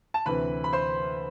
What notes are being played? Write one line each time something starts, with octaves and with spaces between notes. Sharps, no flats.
A5
D2 C3 E3 B4 B5
B5
C5 C6